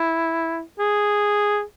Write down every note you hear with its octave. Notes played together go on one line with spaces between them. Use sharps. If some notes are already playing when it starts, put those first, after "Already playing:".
Already playing: E4
G#4